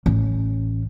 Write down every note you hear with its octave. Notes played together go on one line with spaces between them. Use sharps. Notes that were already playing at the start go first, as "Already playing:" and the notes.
A1 C#4